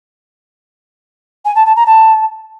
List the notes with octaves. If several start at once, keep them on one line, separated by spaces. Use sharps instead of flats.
G#5
A5
A5
A#5
A5